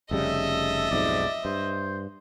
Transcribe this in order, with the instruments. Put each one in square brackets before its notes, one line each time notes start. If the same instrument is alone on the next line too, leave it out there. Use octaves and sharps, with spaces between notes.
[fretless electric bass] F1 C#3 G3 [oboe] A4 [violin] D#5 E5
[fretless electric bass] B1 F2 G#2 [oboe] D5
[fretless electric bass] G2 [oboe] C5